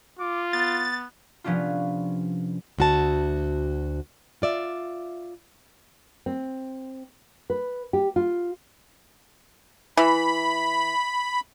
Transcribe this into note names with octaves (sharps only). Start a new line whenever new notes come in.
F4 D6
B3 A6
C3 F3 B3 C#4 D4 F4
D2 F#4 A5
F4 D5 E5
C4
B4
G4
F4
E3 B5